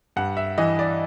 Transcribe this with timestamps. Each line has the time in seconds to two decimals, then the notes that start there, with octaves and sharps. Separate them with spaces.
0.16 G2 F#5
0.37 E5
0.58 E3 D#5
0.79 D5